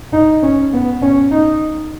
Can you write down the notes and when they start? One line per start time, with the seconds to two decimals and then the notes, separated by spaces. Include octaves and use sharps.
0.13 D#4
0.43 C#4
0.73 B3
1.02 C#4
1.31 D#4